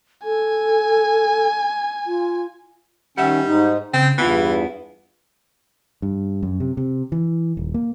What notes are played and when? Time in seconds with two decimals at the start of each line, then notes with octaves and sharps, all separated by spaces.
0.24 A4 G#5
2.07 F4
3.18 D#3 G3 C#4 E5 F#5
3.46 G#2 D#4
3.94 C#3 C4 G5
4.18 E2 G2 E3 B3 E4 F4
6.02 G2
6.43 F#2
6.60 C3
6.77 C3
7.12 E3
7.57 D#1
7.74 A#3